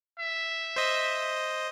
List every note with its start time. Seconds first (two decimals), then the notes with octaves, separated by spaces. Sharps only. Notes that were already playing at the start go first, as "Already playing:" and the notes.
0.19 E5
0.76 C5 D#5